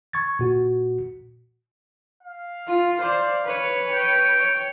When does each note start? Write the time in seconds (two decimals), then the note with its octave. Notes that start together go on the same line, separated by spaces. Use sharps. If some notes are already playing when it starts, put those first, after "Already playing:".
0.13 C#6 G#6 A6
0.39 A#2 F#4
2.23 F5
2.67 F4
3.00 C5 D5
3.44 B4 C#5
3.89 G5
4.38 C#5